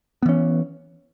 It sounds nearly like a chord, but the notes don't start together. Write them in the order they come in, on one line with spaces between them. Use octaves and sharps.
B3 E3 C#4